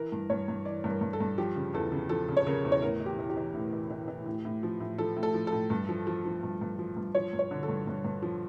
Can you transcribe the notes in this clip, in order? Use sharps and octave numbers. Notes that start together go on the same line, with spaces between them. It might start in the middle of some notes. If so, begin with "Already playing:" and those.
Already playing: E3 A#4
G2
G2 C#5
G2
E3 D5
G2
A#4
G2
A4
G2
F3 G4
C#3
E2 A4
C#3
F3 A4
C#3
C#5
C#3 A#4
E2
C#5
A2 A#4
E3
G4
E3
G4
E3
A2
E3
E3
E3
A2
A2
F3
A2
F3 A4
A2
A4
F3
A2 A4
G2
F3
F3
F3
G2
G2
F3
G2
F3 C#5
G2
C#5
D3
A4
G2
G2
G2
F3